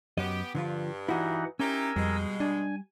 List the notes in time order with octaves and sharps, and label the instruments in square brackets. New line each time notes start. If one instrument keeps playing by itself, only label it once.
[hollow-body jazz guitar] F#2 C#5 D#5 [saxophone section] B3 G4
[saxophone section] G2 [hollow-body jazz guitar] D3 F3 F4
[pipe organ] E3 D#4 F#5 [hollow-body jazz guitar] E4 F#4 D#5
[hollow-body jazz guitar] C#4 [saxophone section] D#4 E4 G4 [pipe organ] A#4 G#5 E6
[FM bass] F2 [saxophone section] B2 G#3 [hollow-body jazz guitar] G3
[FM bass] D4 [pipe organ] G#5